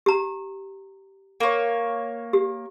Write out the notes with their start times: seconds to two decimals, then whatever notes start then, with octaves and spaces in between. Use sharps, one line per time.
0.06 G4 A#5
1.40 A#3 C#5
2.33 G4